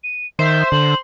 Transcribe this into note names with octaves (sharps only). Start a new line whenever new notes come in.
D#7
D#3 C5 E5
D3 F#7